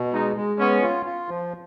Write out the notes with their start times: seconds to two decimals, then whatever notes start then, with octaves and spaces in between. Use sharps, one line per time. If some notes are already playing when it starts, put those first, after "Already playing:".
Already playing: B2
0.13 G#3 D#4
0.37 G#3
0.60 B3 C#4
0.82 F4
1.06 F4
1.29 F3